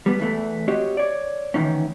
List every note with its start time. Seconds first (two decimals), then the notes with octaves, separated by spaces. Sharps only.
0.06 G3 B3
0.20 E2 E3 A3
0.68 C4 F#4 G4 C#5 D#5
0.97 C#5 D5
1.54 D2 D#3 E3 C#4